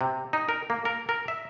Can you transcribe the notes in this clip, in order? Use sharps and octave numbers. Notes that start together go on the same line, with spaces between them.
C3
D#4
A#4
A#3
A#4
A#4
E5